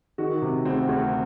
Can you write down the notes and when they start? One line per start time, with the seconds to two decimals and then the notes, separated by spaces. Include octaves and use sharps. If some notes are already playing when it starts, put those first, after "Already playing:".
0.18 D#3 F#4
0.42 C3
0.65 D2 C4
0.89 D2